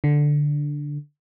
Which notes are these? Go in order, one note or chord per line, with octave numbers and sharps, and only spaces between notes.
D3